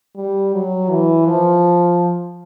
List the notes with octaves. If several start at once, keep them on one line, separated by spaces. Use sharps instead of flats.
G3
F#3
E3
F3